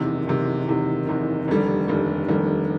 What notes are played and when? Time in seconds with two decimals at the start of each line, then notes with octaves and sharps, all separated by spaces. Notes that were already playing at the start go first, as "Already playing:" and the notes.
Already playing: F#1 E2 C3 D#3
0.27 F#1 E2 C3 D#3
0.67 F#1 E2 C3 D#3
1.07 F#1 E2 C3 D#3
1.48 F1 D#2 D3 G3
1.88 F1 D#2 D3 G3
2.28 F1 D#2 D3 G3